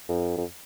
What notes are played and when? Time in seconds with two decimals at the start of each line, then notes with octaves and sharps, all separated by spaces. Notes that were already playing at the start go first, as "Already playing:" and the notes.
0.09 F2
0.37 F2